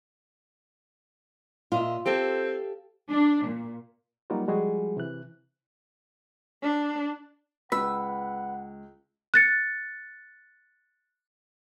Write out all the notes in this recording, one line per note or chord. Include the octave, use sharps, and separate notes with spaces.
A#2 F4 D#5 E5
C4 G4 A4 F5
D4
A#2
F#3 G3 A#3 D#4 F4 F#4
F3 G3 G#3 F#4 G#4
C3 E3 F#6
D4
C#2 B4 F#5 E6
F#6 A6 C#7